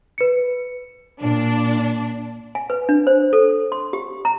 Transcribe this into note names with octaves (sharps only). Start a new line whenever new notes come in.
B4 C#7
A#2 D4
G#5
B4
D4
C5
A4
C6
G4
A#5